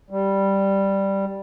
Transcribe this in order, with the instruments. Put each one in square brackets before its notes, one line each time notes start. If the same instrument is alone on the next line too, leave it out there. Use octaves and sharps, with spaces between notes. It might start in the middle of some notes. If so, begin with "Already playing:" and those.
[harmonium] G3